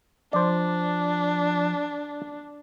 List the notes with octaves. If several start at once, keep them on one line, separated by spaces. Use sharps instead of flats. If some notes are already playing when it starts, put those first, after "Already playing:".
F3 D4 C5 D5